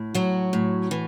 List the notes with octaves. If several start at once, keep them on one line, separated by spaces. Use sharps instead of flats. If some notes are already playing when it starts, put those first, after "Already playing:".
Already playing: A2
F#3 F#4
A2
E3